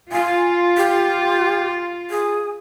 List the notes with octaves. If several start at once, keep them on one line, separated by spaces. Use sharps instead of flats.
F4 G#5
G4
G#4